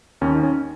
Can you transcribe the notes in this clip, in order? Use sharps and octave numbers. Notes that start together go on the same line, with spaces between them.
D#2 C#4
D#4
C#4